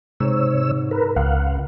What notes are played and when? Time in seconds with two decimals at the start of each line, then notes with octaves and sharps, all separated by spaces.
0.20 G#2 C3 C#5 E6
0.91 A#4 B4
1.16 C#2 F5 F#5